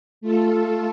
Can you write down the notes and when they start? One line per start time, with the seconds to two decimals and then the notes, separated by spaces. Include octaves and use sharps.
0.21 A3 F4 A4